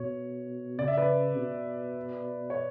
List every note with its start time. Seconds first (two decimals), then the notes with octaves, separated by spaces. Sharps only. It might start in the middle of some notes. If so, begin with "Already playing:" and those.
Already playing: B2 C#5
0.79 C#3 D5
0.88 E5
0.98 B4 D5
1.37 B2
2.50 C#5